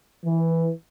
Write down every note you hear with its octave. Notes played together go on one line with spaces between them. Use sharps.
E3